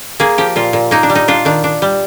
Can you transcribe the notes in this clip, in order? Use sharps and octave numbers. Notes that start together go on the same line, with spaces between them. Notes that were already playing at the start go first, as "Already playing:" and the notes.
A#3 G#4
F3 G4
A#2 F4
A#2
A#3 D#4
D4
G3
D#4
D4 F4
D#3 D4
D4
G3